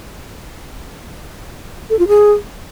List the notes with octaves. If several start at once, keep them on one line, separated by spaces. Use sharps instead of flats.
A4
F4
G#4